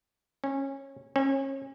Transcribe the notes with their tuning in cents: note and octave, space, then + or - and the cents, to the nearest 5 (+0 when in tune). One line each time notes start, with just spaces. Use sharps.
C#4 -20
C#4 -35